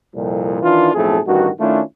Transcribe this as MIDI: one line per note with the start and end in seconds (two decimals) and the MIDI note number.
0.15 0.58 36
0.15 0.58 41
0.15 0.58 46
0.62 0.93 51
0.62 0.93 52
0.62 0.93 62
0.62 0.93 65
0.94 1.19 35
0.94 1.19 41
0.94 1.19 45
0.94 1.19 57
0.94 1.19 68
0.94 1.19 69
1.26 1.50 33
1.26 1.50 43
1.26 1.50 51
1.26 1.50 66
1.59 1.80 51
1.59 1.80 57
1.59 1.80 61
1.59 1.80 62
1.59 1.80 64
1.59 1.80 65